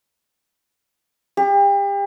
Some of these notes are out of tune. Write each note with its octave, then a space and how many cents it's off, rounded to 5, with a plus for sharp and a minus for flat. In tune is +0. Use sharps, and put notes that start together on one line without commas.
G4 +35